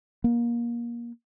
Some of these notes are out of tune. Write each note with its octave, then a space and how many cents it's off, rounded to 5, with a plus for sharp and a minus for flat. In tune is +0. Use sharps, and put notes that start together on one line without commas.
A#3 +25